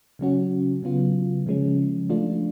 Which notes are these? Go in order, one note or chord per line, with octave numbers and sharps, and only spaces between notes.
C#3 F#3 C#4 F#4
C#3 F#3 B3 F4
C#3 F3 G#3 C#4
F3 A3 D4 F4